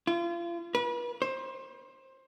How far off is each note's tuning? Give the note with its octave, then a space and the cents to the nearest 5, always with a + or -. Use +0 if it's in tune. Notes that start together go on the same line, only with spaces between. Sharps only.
F4 -35
B4 -35
C5 +20